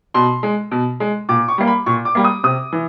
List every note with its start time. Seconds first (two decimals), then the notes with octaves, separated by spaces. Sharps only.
0.14 B2 C6
0.43 G#3
0.71 B2
1.00 G#3
1.29 A#2 D6
1.48 C#6
1.58 G3 A#3
1.67 B5
1.86 A#2 C#6
2.05 D6
2.15 G3 A#3
2.24 D#6
2.44 C3 D#6
2.72 E3